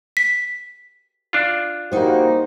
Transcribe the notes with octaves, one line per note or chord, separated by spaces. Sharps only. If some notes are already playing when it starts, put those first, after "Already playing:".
B6
D4 F4
G3 A#3 D#4 F#4 C5